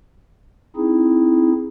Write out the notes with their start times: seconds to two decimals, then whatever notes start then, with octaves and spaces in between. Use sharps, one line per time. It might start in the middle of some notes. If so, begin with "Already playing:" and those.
0.76 C4 D#4 E4 G#4